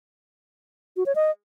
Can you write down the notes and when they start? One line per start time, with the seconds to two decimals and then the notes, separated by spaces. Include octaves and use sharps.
0.97 F#4
1.06 C#5
1.15 D#5